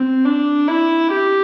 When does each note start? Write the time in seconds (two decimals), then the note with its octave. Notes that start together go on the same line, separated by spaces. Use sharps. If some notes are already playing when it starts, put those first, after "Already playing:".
Already playing: C4
0.25 D4
0.68 E4
1.12 G4